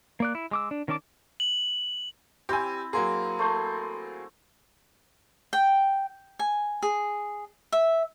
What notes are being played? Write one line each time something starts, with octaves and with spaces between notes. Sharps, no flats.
A#3 D5 F#6
E4
G#3 D6 E6
D4
D#3 C#4 D5 A5 D6
F#7
C4 E4 G4 G#5
F#3 A#3 G#4 A#5 C6
A3 C5
G5
G#5
G#4
E5